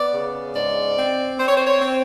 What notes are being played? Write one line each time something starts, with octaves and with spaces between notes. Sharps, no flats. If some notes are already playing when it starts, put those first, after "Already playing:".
Already playing: B3 D5
C#3
G#2 D5
C4
C4 C5
C#5
C5
C#5
C4